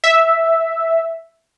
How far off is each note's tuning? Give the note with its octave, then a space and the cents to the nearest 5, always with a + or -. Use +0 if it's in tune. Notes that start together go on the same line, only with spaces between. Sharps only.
E5 +0